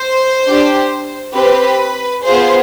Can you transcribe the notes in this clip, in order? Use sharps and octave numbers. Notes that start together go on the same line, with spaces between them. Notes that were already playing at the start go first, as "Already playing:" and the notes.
Already playing: C5
D4 G4
C4 G4 B4
B3 F4 G#4 C5